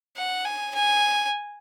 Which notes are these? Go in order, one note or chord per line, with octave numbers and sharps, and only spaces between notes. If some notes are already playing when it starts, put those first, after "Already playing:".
F#5
G#5
G#5